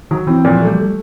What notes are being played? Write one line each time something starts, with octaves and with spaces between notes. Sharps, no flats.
D#3 F#3
E3 C4
A#2 F3
F#3
A3
G3
A3